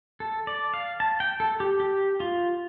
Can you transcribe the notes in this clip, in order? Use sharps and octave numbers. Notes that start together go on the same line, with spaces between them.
A4
D5
F5
A5
G5
A4
G4
G4
F4